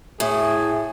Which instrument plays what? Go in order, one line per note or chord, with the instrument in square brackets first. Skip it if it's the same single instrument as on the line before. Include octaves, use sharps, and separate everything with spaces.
[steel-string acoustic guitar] A2 [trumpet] G#4